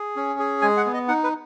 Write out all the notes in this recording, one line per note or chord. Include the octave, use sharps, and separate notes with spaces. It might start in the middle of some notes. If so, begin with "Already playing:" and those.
Already playing: G#4
C#4
G#4
G#3 G#5
F#5
B3
D#5
D#4 F#5
B4